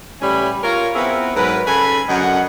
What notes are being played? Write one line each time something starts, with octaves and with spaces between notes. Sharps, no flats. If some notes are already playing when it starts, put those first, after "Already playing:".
A2 E3 G3 C#4 G#5 B5
F4 A#4 C#5
B3 C4 E4 G#4 A#4 B4
G#2 F#3 A#4 B4
C#3 A4 G#5 B5
F#2 D3 A#4 D#5 F#5